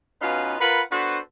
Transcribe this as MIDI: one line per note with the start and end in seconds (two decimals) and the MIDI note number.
0.21 0.55 47
0.21 0.55 61
0.21 0.55 63
0.21 0.55 65
0.21 0.55 71
0.21 0.55 77
0.60 0.81 65
0.60 0.81 70
0.60 0.81 71
0.60 0.81 78
0.60 0.81 83
0.91 1.19 59
0.91 1.19 62
0.91 1.19 66
0.91 1.19 69
0.91 1.19 71
0.91 1.19 72